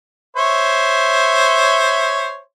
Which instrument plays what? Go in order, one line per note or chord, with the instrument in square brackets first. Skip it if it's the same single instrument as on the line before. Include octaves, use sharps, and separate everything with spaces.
[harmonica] C5 C#5 E5